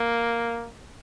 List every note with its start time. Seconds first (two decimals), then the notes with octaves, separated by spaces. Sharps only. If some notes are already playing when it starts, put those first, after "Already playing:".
Already playing: A#3